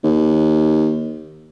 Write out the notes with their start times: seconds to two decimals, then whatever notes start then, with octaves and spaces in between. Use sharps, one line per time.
0.04 D#2